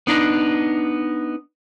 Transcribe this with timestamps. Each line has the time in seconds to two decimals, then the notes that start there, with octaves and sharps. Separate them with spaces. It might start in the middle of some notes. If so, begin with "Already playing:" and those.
0.07 B3 D4 D#4